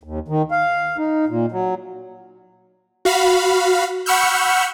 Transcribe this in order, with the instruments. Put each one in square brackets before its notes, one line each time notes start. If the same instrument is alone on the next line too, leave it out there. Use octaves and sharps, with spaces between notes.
[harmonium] D#2
D#3
F5
D#4
A#2
F#3
[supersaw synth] F#4 F5 B5
F#5 B5 C#6 E6 F6 G6